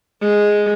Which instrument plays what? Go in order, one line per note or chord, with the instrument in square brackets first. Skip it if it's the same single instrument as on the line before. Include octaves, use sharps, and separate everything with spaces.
[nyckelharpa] G#3